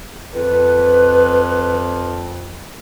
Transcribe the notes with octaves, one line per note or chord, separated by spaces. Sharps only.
F2 B4